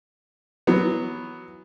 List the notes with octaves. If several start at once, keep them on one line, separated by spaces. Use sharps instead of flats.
E3 F#3 B3